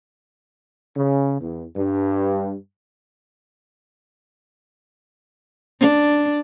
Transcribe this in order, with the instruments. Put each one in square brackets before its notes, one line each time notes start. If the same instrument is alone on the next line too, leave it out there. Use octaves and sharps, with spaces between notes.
[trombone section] C#3
E2
G2
[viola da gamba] D4